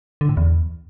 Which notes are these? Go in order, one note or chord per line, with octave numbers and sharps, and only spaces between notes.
D3
A2
E2